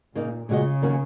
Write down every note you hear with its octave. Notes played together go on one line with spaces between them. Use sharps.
A#2 C#3 A#3 D#4
A#2 C#3 G#3 F#4 D#5
D#3 F#3 A#3 C#4 F#4